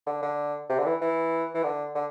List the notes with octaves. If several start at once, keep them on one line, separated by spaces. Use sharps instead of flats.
D3
D3
C3
D3
E3
E3
E3
D3
D3